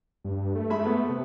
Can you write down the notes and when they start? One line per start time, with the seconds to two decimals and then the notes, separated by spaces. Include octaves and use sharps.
0.24 G2
0.55 A3
0.70 G#3 E5 B5
0.85 B3
1.09 C3